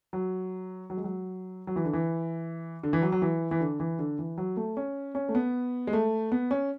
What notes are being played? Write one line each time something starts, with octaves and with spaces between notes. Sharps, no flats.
F#3
F#3
G#3
F#3
F#3
E3
D3
E3
D3
E3
F#3
F#3
E3
E3
D3
E3
D3
E3
F#3
A3
C#4
C#4
A3
B3
G#3
A3
B3
C#4